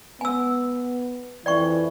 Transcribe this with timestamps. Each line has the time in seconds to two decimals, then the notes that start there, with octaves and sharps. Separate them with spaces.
0.21 B3 G#5 E6
1.46 F2 E3 D5 G5 C#6